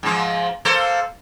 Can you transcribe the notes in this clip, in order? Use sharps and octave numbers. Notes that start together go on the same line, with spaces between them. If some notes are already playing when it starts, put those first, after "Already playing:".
G#2 F3
A#3 A4 C5